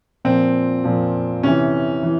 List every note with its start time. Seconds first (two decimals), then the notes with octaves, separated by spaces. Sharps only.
0.25 A#2 F3 C4
0.84 A#2 F3
1.43 C3 E3 C#4
2.03 E3